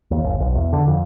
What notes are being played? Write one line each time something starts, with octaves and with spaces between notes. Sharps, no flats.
D#2
G1
B1
E2
D3
F2